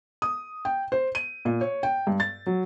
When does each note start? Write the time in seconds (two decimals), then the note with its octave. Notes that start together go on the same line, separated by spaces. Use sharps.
0.22 D#6
0.65 G5
0.92 C5
1.15 D#7
1.45 A#2
1.61 C#5
1.83 G5
2.07 G2
2.20 A6
2.46 F#3